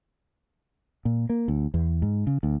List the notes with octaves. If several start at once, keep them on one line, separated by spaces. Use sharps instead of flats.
A#2
A#3
D2
E2
G#2
C#3
D2